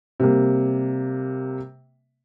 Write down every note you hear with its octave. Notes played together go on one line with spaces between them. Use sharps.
C3 G3 A#3